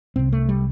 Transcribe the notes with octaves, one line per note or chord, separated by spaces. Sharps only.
C2 C3 C4
A3
G3